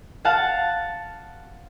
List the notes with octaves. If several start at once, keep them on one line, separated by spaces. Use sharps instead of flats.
F5 F#5 A5